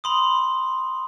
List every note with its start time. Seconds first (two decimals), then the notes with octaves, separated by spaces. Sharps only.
0.04 B5 C6 D#6